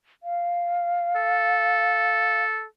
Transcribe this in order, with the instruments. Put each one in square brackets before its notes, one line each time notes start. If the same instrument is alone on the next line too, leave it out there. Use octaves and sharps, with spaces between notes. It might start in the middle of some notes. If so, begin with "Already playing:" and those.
[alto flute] F5
[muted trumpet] A4